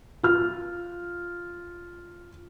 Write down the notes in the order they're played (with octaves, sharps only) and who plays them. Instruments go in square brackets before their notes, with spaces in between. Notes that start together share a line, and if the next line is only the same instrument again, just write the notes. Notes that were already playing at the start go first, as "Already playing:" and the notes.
[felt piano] F4 F6